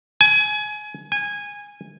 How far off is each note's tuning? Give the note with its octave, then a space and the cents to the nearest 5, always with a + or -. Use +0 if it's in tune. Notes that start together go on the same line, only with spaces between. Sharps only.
G#5 +25
G#5 -15